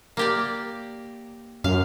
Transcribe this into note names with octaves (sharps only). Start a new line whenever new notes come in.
A#3 G4 D5
F#2 F5